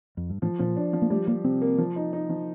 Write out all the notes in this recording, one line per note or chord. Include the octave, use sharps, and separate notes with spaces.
F2
G2
A2 F3
A#2 F3
D4
F3
A#3
G3 A3
G3 A#3
C3 C4
A#3
F3
D#4
D#4
F3